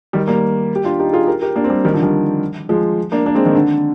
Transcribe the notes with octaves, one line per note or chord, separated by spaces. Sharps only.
D#3 G3
G3 A#3
G4
D4 F4
D#4 G4
F4 G#4
G4 A#4
G4 A#4
A#3 D4
C4
G3 A#3
D#3 G3
D3 F3
D#3 G3
F3 G#3
A#3 D4
A#3 D4
G#3 C4
D#3
D3